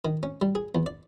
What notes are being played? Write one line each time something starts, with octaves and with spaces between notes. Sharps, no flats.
D#3
C#4
G3
G#4
E2
D5